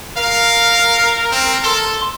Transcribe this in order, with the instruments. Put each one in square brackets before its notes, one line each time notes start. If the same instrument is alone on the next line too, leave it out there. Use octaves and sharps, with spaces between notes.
[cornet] A#4 [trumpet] F5
[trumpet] C4
[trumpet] A4 [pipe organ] C6